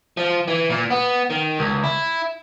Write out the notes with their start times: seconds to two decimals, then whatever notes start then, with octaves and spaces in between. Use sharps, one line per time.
0.17 F3
0.48 E3
0.70 A#2
0.90 B3
1.30 D#3
1.59 C#2
1.84 E4